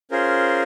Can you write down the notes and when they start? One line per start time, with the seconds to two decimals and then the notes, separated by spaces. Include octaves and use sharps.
0.11 C#4 F4 G#4 A#4 C5